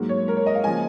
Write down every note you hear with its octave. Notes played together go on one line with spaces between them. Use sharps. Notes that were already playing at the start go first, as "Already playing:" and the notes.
Already playing: G#2 F#3 A#3
C#5
A#4
C#5
D#5
F5
C#3 F3 A#3 G#5